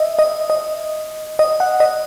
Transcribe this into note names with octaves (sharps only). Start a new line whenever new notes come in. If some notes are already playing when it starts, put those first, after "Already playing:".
Already playing: D#5 E5
D#5
D#5
D#5
F#5
D#5